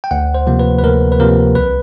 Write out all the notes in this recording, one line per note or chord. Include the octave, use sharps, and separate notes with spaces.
G5
D2 F#5
C5
C3 F3 A#3
B4
B4
D2 A#4
B4
C3 F3 A#3 A#4
C2 B4